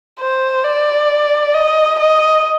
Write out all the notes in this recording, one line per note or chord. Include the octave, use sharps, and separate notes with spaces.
C5
D5
D#5
D#5